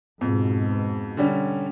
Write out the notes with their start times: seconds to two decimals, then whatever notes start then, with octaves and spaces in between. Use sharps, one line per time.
0.21 F2 G#2 B2
1.17 D3 G3 C#4